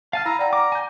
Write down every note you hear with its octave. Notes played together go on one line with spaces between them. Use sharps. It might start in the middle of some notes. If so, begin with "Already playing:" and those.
F5 G#5 A5 F6
E4 A#5 B5 E6
D5 F#5 G5 A#5
A#5 D6
G#5 G6